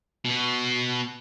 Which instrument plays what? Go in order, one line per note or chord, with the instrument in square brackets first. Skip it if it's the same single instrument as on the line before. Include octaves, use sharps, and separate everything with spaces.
[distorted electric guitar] B2 B3